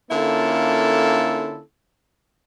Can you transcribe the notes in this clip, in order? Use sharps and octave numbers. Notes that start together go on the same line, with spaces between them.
D3 A#3 C#4 E4 F4 A4